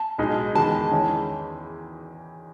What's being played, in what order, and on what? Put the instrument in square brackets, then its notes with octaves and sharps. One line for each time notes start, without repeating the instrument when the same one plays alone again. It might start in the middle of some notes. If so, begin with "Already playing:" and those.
Already playing: [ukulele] A5
[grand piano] B1 B2 G#3 D#4
[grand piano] E2 D#3 G#3 B3 [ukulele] A5
[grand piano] E2 D#3 G#3 C#4 E4